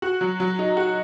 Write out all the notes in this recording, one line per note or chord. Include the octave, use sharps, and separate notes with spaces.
F#4
F#3
F#3
D#4
F#4